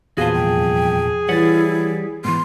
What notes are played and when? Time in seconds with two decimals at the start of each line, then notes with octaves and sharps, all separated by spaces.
0.18 E2 A#2 F#4 G#4 B4 C5 F5 A5
0.34 C2 F2 G5
1.29 E3 G3 E4 C#5 F#5 A6
2.25 G#2 E3 B3 C6